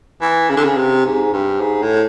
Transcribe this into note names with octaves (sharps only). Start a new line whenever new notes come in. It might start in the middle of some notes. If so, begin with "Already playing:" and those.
E3
C#3
D3
C#3
C3
G#2
G2
G#2
A2